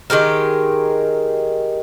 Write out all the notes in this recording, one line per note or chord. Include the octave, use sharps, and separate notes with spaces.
D#3 G#3 G4 A#4